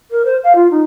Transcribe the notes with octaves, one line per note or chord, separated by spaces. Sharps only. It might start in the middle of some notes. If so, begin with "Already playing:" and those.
A#4
C5
F5
F4
D#4